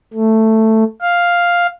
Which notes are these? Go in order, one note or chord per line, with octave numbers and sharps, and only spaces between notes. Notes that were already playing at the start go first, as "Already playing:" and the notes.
A3
F5